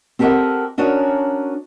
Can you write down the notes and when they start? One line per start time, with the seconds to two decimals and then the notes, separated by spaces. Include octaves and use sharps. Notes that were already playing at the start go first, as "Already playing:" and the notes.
0.19 C4 G4 A4 A#4 D#5 F#5
0.78 C#4 D4 F#4 A#4 C#5 D#5